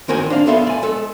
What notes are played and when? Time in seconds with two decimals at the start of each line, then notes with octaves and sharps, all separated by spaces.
0.08 D#3 C4 F#4 A#4 D5 G#5
0.30 D4 F5
0.46 B1 B3 A4 E5 F5 C6
0.67 D5 G#5
0.83 G#3 A4